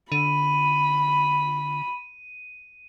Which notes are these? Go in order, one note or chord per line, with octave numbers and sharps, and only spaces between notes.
D3 B5 D#7